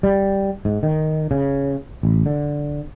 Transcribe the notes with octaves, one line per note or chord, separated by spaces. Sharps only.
G3
G#2
D#3
C#3
A1
D3